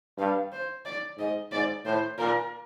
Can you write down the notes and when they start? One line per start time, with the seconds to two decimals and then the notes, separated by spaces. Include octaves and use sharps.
0.18 G2 F5
0.52 C5
0.85 D5
1.18 G#2 D#5
1.52 G#2 D5
1.85 A2 C5
2.18 A#2 A#4